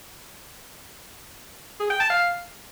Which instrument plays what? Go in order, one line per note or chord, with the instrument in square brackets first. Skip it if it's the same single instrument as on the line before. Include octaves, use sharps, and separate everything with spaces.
[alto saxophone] G#4
G5
A5
F5